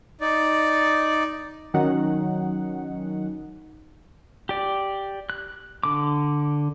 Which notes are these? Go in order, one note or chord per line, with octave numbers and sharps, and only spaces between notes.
D#4 D5
D#3 F#3 C#4 D#4 F#5
G4 D5
F#6
D3 D6